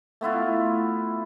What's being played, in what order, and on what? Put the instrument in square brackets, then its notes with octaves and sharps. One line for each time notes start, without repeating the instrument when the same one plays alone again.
[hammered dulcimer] A3 B3 E4 F4